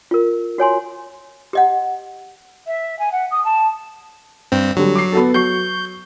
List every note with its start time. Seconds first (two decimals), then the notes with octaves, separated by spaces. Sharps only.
0.11 F4 A#4
0.58 F#4 C#5 G#5 C6
1.53 G4 D#5 F#5
2.66 E5
2.99 G#5
3.12 F#5
3.31 D#6
3.44 A5
4.52 G2 C4
4.77 D3 F#3 G3
4.95 D6 C7
5.13 B3 F#4 A4
5.34 F#3 C#6 G6 C7